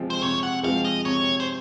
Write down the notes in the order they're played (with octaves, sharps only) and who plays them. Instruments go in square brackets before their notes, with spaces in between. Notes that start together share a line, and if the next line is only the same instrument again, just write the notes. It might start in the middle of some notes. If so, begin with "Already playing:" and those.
Already playing: [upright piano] C3 F3 G#3 C4
[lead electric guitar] C5
[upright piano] C3 [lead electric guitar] C#5
[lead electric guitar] F#5
[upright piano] F3 G#3 C4 [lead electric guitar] F5
[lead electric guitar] D#5
[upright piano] C3 [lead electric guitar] C#5
[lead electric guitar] C5